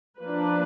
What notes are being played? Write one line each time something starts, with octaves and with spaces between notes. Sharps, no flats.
F3 A#3 D4 B4